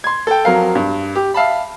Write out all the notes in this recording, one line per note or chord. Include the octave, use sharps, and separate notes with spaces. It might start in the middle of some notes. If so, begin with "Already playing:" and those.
C6 G#6
A4 G5
F2 F#3 A#4 F5
G2
G4
E5 F5 A5 B5